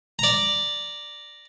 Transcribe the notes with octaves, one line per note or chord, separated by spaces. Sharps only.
D5 A#5